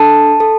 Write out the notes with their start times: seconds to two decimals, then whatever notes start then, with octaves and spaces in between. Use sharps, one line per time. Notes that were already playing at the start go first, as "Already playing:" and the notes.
Already playing: D4 A4 A5
0.40 A4